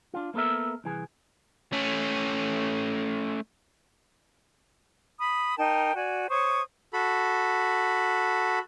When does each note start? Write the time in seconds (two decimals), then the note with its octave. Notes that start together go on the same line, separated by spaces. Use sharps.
0.14 D4 F4
0.34 A#3 B3 A4 A#4 E5
0.84 C2 E3 G#4
1.73 A3 C#4
5.18 B5 D#6
5.58 D#4 A#4 G5 A5
5.96 F#4 D5 G#5
6.30 C5 C#5 C#6 D#6
6.93 F#4 A4 B5